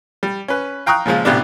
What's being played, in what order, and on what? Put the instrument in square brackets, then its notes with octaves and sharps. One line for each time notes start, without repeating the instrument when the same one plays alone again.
[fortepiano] G3
C#4 B4
F5 G5 A#5 C#6 D#6 F#6
A#2 C#3 F3 G#3
A1 C3 B3 D4